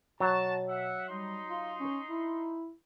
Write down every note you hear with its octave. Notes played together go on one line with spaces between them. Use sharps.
B2 F#3 F#4 A5
E5 F#5
G3 D#4 C6
F4
C#4
E4